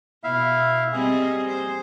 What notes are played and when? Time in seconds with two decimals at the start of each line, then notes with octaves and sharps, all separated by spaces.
0.24 B2 E4 E5 F5
0.92 G3 C4 G#4 D#5
1.48 C5